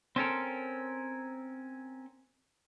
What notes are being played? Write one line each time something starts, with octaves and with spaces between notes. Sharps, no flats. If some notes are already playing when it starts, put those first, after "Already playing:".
C4 C#4 A4 A#4